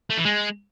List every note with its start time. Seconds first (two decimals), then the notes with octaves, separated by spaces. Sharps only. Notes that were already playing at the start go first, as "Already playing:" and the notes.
0.10 A3
0.17 E3
0.25 G#3